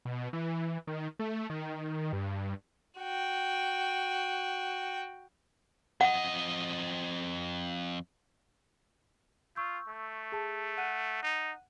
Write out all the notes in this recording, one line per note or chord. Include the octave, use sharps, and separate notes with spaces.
B2
E3
D#3
A3
D#3
G2
F#4 G5
F2 D#5 F#5
F4 C#6 E6 G6
A3
G#4 A5
F#5 F#6 D#7
D#4